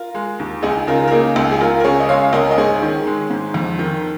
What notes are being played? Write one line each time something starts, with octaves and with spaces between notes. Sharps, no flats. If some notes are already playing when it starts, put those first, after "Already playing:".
Already playing: F4 A#4
G#3
D#2
C#2 D#4 G#4
C#3 F4 A#4
A#4
A#3 D#4 G#4
C#2
G#4
C#2 F4 A#4
A#4
C#3 G#4 C#5
D#5
G#3 C#5 F5
C#2 A#4 D#5
D#5
G#2 G#4 C#5
D#3
G#3
G#2
F2
D#3